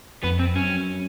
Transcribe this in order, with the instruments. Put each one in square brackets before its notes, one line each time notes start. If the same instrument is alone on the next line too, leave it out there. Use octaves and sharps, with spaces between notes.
[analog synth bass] F2 [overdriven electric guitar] B3
[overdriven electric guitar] C4
[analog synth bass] F#2 [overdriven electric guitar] C#4